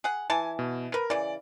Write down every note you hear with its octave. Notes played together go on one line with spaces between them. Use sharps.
G#4 F#5
E3 G#5 A5
B2
A#4 B4
C#3 E3 D5